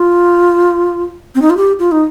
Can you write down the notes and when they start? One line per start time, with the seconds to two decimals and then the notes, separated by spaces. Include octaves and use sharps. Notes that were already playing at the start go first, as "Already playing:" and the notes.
Already playing: F4
1.35 C4
1.42 D#4
1.50 F4
1.57 G4
1.79 F4
1.92 D#4